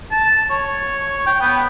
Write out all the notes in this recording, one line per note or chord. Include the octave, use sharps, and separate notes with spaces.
A5
C#5
G5
B3